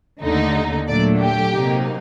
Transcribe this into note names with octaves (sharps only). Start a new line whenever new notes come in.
D#2 D3 A3 D#4
A#2 F#3 A3 D4 D5
G4
C3 F#3 A#3 D#4